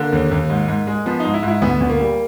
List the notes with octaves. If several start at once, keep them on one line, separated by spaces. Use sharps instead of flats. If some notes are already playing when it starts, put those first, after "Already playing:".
Already playing: D3 A#3
D#2
D#2
G#2
G#2
G#3
F3 B3
G#2 D#4
E4
G#2
E4
D2 B3
D2 B3
A#3
G3